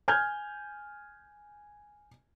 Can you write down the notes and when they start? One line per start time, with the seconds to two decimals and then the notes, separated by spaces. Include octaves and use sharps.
0.08 G#5 F6 G6 G#6